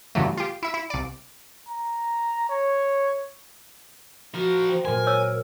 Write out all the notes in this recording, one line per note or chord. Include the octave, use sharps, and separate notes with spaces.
G2 C#3 E3 F#3 A3
F4 G4
E4 E5
E4
C2 D5
A#5
C#5
F3 F#4 A#4
C5 G5
A#2 F#3 A#4 G#5 C6
C#5 E6